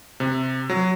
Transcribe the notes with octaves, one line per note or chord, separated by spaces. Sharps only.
C3
F#3